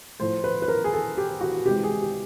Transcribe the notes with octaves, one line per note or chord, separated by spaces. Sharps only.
A2 F3 A3 C5
B4
B4
A#4
G#4
A4
G4
F#4
C3 E3 G#3 G4
G#4
G4